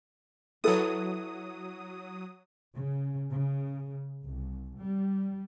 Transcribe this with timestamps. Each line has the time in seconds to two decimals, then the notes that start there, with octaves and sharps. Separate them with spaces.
0.64 F#3 E4 A4 B4 D#6
2.75 C#3
3.31 C#3
4.22 C2
4.78 G3